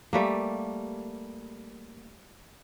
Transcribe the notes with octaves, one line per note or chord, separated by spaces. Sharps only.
G3 A3 A#3